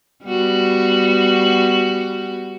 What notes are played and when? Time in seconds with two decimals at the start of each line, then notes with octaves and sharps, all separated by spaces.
0.25 G3 B3 F#4